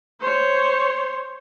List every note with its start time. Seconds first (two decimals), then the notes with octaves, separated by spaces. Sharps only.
0.20 C5 C#5